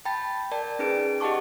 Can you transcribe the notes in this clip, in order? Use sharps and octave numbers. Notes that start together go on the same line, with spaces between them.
G5 A5 B5 A6
A#4 D5 G5 A5
C#4 D#4 G#4 B4 D7
G4 D#5 F#5 A5 C#6 D6